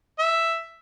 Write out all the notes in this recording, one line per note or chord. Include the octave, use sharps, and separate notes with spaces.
E5